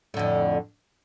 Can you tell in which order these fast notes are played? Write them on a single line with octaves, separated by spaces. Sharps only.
A2 D3 F2